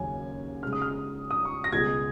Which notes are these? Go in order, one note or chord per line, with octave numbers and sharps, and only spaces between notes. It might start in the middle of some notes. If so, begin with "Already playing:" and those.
Already playing: D#2 C#3 F#3 C#4 G#5
C#3 G#3 D#4 F6
D#6
F6
D#6
C#6
A#6
C#2 B2 G#3 G#6